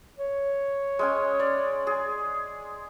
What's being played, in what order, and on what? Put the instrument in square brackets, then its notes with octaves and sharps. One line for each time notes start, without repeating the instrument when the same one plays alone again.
[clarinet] C#5
[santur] G#3 C#4 G#5
D5
G#4